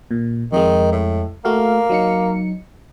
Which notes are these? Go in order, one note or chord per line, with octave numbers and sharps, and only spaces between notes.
A#2
F2 D#3 G#3
A2
A3 A#3 F#4 F5
F#3 D#4 C#7